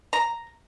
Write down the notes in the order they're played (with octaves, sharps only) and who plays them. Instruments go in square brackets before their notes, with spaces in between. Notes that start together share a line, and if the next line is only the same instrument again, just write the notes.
[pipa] A#5